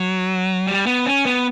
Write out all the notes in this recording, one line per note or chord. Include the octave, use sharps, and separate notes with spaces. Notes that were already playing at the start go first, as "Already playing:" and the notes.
Already playing: F#3
G3
B3
C#4
B3